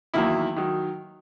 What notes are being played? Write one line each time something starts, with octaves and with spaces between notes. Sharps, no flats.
E2 D#3 F#3 A#3 E4
D#3 F#3